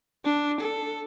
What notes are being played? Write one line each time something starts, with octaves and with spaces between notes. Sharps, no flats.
D4
A4